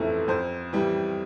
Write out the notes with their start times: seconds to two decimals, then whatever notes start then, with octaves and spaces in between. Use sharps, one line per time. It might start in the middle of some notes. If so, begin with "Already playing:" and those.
Already playing: G1 F2 E3 A3
0.28 F2 C5
0.73 E3 G3